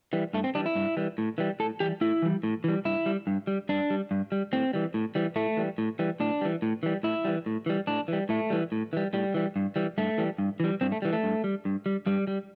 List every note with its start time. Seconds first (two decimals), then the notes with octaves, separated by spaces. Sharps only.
0.13 E3 G3
0.34 G2 A3
0.44 C4
0.55 E3 G3 D4
0.66 E4
0.75 G2
0.97 E3 G3
1.18 A2
1.38 E3 G3
1.60 A2 A4
1.80 E3 G3 G4
2.01 A2 E4
2.22 E3 G3
2.43 A2
2.64 E3 G3
2.85 G2 E4
3.06 G3
3.27 G2
3.47 G3
3.69 G2 D4
3.90 G3
4.11 G2
4.32 G3
4.53 A2 C4
4.73 E3 G3
4.94 A2
5.15 E3 G3
5.36 A2 A3
5.57 E3 G3
5.78 A2
5.99 E3 G3
6.20 A2 D4
6.41 E3 G3
6.62 A2
6.83 E3 G3
7.03 A2 E4
7.25 E3 G3
7.46 A2
7.66 E3 G3
7.87 A2 D4
8.08 E3 G3
8.29 A2 A3
8.50 E3 G3
8.72 A2
8.93 E3 G3
9.13 A2 G3
9.34 E3 G3
9.56 G2
9.76 E3 G3
9.98 G2 A3
10.18 E3 G3
10.38 G2
10.60 E3 G3
10.81 G2 C4
10.92 A3
11.02 E3 G3
11.13 A3
11.23 G2
11.44 G3
11.65 G2
11.86 G3
12.06 G2 G3
12.27 G3